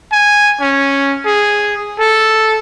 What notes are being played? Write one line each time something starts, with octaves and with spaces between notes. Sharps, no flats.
G#5
C#4
G#4
A4